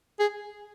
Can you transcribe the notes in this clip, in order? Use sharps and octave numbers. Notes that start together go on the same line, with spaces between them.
G#4